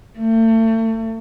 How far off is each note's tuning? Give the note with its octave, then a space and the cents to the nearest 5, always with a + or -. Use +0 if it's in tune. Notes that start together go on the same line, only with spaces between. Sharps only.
A3 +35